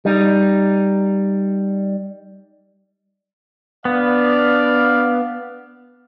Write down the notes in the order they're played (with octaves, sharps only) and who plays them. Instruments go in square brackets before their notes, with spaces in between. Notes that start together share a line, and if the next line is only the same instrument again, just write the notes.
[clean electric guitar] G3 D#4
[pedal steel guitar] B3 [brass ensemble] D4 D5 F5